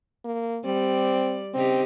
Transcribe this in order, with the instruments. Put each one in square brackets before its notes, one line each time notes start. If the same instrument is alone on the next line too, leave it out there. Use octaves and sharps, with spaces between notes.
[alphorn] A#3
[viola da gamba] G3 D5 [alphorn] C4
[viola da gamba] C#3 D#4 G4 [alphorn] C4